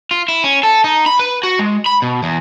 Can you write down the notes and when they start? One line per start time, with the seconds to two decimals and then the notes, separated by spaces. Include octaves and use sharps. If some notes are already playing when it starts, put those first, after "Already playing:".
0.11 F4
0.28 E4
0.44 C#4
0.63 A4
0.84 D#4
1.06 B5
1.19 B4
1.43 F#4
1.59 G#3
1.86 B5
2.02 B2
2.23 E2